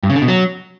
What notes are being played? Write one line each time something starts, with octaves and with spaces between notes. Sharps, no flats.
G2
C#3
D3
B2
F#3